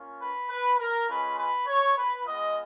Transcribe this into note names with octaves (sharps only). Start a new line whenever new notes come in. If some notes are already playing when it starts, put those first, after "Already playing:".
Already playing: A#3 C#4 F4
B4
B4
A#4
G#3 C#4 F4 B4
B4
C#5
B4
G#3 B3 F4 D#5